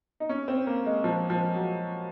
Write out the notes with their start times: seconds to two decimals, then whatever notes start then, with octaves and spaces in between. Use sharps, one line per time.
0.20 D#4
0.29 C#4
0.48 C4
0.67 A#3
0.86 G#3
1.04 F3
1.30 F3
1.55 F#3